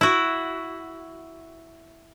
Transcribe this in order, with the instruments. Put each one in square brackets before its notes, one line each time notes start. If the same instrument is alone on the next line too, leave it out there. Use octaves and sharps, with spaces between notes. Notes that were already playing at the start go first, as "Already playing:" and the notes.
[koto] E4 F#4